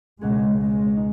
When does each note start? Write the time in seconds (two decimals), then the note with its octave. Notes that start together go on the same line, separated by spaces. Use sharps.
0.21 C#2 B2 G#3 B3 G#4
0.59 G#3
0.96 D#4